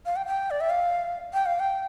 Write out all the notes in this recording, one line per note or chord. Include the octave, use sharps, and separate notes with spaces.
F5
G5
G5
D5
E5
F5
G5
F5
G5